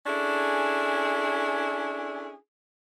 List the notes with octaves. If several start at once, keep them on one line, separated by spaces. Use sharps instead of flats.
C#4 D4 E4 G#4 A4